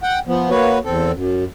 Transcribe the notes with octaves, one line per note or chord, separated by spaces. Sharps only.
F#5 G5
F3 B3
A#3 F#4 B4 C#5
E2 C4 A4
F#2